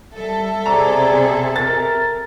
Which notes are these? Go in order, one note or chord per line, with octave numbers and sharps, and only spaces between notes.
G3 A4 E5
C3 G#4 D5 A#5
A#4 A6